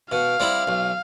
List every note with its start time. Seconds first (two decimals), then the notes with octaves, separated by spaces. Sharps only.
0.11 B2 F5
0.40 G3 C4 E4
0.67 B1